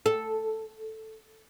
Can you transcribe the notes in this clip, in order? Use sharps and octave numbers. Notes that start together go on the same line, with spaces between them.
A4